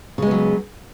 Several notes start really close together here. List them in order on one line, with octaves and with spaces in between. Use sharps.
C#3 G#3 B3 F#3